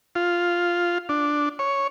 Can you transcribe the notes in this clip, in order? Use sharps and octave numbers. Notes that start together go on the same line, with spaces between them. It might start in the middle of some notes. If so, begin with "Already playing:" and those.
F4
D4
C#5